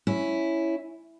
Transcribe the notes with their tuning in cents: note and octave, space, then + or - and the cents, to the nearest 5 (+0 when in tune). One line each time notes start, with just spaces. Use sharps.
C#4 +0 E4 +0